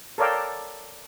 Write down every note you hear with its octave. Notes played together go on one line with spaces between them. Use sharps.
A4 A#4 C#5 D5 F5 G5